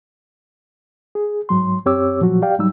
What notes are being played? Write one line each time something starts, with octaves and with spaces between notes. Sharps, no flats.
G#4
G#2 F#3 C6
F#2 C4 G4 C#5 D6 E6
A#2 F3 F#3 F#4
G4 D5 F5 G5
G#2 F#3 G3 D#4 E6